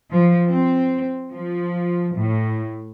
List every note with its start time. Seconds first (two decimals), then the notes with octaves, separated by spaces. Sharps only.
0.13 F3
0.49 C4
1.33 F3
2.16 A2